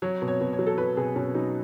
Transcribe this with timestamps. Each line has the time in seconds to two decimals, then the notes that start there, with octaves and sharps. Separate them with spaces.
0.02 F#3 C#5
0.22 B2
0.28 C#5
0.41 B2
0.53 C#5
0.59 F#3
0.67 A4
0.78 F#3 B4
0.97 B2 G#4
1.16 B2 C#4
1.34 F#3 D#4